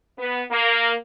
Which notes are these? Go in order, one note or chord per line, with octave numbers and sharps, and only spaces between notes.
B3
A#3